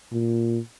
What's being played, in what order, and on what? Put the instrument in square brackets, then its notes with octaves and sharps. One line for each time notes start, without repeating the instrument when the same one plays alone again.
[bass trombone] A#2